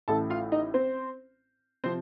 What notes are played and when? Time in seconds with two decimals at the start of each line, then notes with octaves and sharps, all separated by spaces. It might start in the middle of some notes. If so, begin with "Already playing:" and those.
0.08 A1 A2 A3 A4 A5
0.30 F4 F5
0.52 D#4 D#5
0.74 C4 C5
1.84 C3 F3 C4 C5